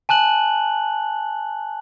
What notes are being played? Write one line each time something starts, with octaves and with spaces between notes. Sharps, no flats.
G#5 A5 F#6 F#7